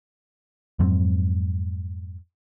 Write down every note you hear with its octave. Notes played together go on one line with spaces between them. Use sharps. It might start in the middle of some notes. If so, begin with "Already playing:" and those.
F2 G#2 F#3 C4